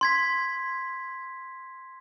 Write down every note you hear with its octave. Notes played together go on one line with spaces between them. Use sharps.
C6 G#6 B6